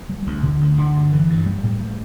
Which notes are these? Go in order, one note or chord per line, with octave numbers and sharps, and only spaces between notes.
G3
D2
D3
D2
D3
G2
E3
G2
G3
A2
G3